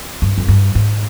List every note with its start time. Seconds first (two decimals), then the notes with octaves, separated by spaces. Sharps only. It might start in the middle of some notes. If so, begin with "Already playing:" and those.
0.22 G2
0.38 F2
0.48 G2
0.75 G#2